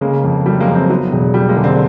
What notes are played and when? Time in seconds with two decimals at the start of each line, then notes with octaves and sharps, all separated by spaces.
0.01 C#3 G#3 A#3
0.24 F2
0.46 F#3 G3 A3
0.60 G#3 A#3
0.68 F2
0.75 A#3 C4
0.90 F#3 A3 B3
1.12 E1
1.34 F#3 G3 A3
1.49 G#3 A#3
1.56 D3
1.64 C4 D4